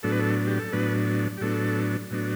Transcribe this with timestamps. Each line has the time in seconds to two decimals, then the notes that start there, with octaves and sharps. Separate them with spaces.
0.03 A2 F#3 B3 D4 A4
0.12 B4
0.19 A4
0.47 G4
0.59 A4
0.72 A2 F#3 B3 D4 B4
1.37 G4
1.41 A2 F#3 B3 D4 A4
2.11 A2 F#3 B3 D4